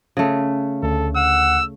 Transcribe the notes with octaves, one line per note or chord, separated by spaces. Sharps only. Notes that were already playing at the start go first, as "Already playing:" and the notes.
C#3 A3
D2 A4
F#5 E6